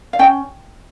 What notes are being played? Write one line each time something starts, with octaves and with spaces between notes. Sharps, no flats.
F5
C#4 G5